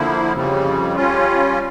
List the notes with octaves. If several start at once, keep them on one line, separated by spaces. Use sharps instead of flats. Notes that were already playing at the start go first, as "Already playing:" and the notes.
Already playing: D3 F3 A#3 E4
F2 C#3 G3
G3 C#4 F4